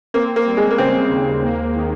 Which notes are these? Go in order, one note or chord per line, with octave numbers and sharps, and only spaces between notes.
A#3 C4
A#3
G3
G#3
A#3
C#3 C4
D#2
A#3
D#3